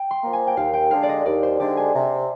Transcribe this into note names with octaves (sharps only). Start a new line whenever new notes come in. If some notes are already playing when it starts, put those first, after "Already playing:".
Already playing: G5
C6
F3 A#3
G#5
G5
D#2 F5
G5
D3 G#3 D4 G4 F5
D5
D#5
D#2 D5
C5
D3 G#3 D4 G4 D5
G#5
C3